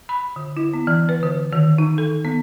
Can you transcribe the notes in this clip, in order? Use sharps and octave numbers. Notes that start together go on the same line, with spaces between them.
B5
D3
E4
B3
E3
B4
D3
D#3
D#4
A4
B3